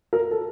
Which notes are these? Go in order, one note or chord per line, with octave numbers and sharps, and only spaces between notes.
A#4
A4